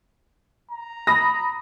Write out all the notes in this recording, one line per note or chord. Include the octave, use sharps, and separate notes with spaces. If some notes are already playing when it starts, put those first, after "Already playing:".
A#5
B5 D#6 A#6